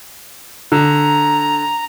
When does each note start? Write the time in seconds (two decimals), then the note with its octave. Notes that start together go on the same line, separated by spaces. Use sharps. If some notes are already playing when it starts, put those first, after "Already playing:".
0.72 D3 A#5